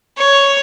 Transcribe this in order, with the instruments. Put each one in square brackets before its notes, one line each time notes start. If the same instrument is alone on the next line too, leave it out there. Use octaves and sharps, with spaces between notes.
[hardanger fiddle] C#5